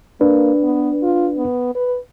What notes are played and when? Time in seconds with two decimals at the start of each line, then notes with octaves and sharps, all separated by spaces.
0.21 A#3 D4 B4
0.63 B3
1.03 F4
1.37 B3
1.75 B4